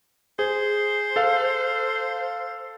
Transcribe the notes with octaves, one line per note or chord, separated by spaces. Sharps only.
G#4 C5
A4 F5